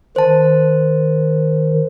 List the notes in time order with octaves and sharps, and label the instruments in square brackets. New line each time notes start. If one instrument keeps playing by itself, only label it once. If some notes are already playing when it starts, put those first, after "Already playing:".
[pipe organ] D#3 [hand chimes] C5 A5